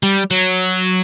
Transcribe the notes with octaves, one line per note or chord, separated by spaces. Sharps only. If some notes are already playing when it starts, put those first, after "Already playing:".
G3
F#3